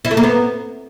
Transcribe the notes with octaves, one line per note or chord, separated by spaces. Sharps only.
E4
A3
A#3
B3